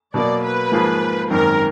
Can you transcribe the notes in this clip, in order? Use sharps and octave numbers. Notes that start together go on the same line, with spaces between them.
B2 F#3 A#3 D5
B4
G#2 F3 A#3 F4 G#4
G#1 F#2 D#3 A#4